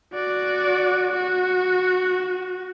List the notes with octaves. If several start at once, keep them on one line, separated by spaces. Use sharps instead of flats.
F#4 D5
F#4